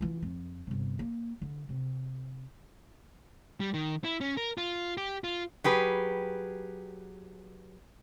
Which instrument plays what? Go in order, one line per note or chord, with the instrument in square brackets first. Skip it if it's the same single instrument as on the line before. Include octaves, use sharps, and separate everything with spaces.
[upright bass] E3 F4
F2
G1 C3
A#3
D3
C3
[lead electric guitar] G3
D#3
E4
C#4
A#4
F4
G4
F4
[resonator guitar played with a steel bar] F#3 G4 G#4 B4